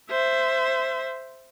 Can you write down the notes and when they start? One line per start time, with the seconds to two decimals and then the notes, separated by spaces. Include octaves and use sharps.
0.10 C5 E5